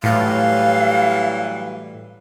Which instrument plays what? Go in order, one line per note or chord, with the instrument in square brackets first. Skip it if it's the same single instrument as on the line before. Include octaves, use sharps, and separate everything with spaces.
[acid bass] A2 [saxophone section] E3 F#3 G3 [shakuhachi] F5